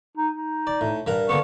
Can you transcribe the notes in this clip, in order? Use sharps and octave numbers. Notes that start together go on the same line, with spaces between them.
D#4
D#4
D5
A2
G2 A#4 F#5
D3 A#3 B3 C#6